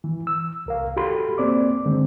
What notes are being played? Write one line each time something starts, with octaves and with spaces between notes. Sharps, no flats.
E3
E6
C2 A#4 F5
F#4 G4 A4 B5 C6
A#3 C4 D5 D6
D3 G#3 C4